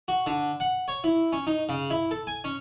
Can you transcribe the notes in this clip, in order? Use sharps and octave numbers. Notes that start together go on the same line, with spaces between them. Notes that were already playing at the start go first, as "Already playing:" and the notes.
F#4
D3
F#5
C#5
E4
C#4
D#4
C#3
E4
A4
G#5
C#4